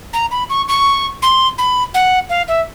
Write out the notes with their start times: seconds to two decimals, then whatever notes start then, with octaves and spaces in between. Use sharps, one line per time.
0.13 A#5
0.31 B5
0.50 C#6
0.68 C#6
1.22 C6
1.58 B5
1.94 F#5
2.30 F5
2.48 E5